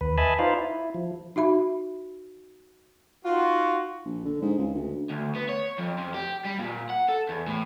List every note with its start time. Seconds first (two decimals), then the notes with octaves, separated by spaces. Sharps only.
0.01 D#2 B4
0.18 B4 D#5 E5 G#5 A5 B5
0.39 D#4 F4 B4 C5 D5 F5
0.58 E4
0.94 F3
1.36 D#4 F#4 E5 B5
3.25 D#4 F4 F#4
4.05 A#1
4.24 D3
4.42 G#2
4.58 C#2
4.74 D2
5.10 D2
5.35 B3
5.49 C#5
5.78 F2
5.98 F2
6.14 G4
6.46 G3
6.60 A#2
6.90 F#5
7.09 A4
7.29 E2
7.48 A2